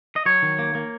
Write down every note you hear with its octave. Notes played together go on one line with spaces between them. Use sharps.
D#5
F#3 C#5
D#3
A#3
A#3